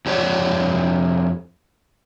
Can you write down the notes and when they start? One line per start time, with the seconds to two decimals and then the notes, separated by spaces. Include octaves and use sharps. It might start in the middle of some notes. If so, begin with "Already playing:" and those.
0.06 F2 G4 C#5 D5